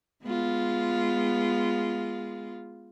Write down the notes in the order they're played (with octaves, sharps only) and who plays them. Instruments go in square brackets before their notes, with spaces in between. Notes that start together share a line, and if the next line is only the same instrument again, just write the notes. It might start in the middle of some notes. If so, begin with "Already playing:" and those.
[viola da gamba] G#3 B3 F4